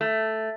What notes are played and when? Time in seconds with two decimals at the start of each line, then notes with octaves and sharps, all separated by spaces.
0.01 A3